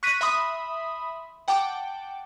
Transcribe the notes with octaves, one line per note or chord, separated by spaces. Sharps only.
C#6 F#6 A#6 B6 D#7
E5 B5 C6 D#6
F#5 G5 A5 D6